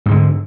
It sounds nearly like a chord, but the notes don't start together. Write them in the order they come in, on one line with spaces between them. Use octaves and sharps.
G#2 G#3 D3